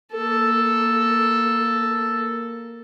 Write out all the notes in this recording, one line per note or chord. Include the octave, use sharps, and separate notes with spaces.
A#3 A4